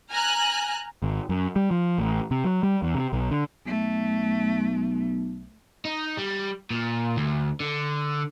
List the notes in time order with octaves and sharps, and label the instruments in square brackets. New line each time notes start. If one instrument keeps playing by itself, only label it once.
[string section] G#5 A#5 F6 F#6
[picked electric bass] G#1
F#2
G3
F3
A1
C3
F#3
G3
E2
C3
B1
D3
[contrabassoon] B1 [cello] A3
[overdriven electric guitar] D#4
G3
A#2
D2
D3